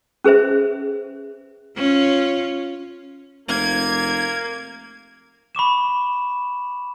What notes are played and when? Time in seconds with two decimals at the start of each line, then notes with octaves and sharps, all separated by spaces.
0.24 C#4 G#4 B4 C5 E5
1.76 C#4 F4
3.48 F1 A#3 G#6
5.55 B5 C#6 D6 E7